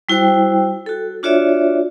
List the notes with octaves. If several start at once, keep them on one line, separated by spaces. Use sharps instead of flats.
G3 E4 F#4 C5 G5
F#4 A4
D4 F4 F#4 C#5 D5 E5